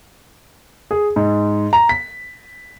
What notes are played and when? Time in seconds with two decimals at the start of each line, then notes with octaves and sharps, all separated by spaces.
0.91 G#4
1.16 G#2
1.73 A#5
1.89 B6